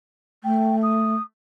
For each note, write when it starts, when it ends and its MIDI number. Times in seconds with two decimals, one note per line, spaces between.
0.44 1.14 57
0.44 0.75 79
0.82 1.22 87